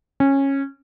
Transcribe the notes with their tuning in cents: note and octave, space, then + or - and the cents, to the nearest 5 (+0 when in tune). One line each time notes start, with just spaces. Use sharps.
C#4 -15